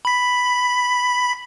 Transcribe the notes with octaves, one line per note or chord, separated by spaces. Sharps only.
B5 B6